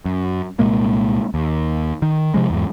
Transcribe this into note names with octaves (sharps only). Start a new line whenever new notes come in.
F#2
C2 A#2 G#3 A#3
D#2
D#3
C3 F3 G#3
E2 G#2